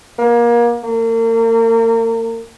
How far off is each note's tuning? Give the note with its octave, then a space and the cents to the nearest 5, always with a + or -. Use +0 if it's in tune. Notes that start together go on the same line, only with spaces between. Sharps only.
A#3 +25
A#3 -35